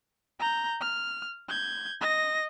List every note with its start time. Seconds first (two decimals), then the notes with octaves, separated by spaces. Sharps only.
0.39 A#5 G6
0.81 F6
1.49 G6 G#6
2.01 D#5 A#6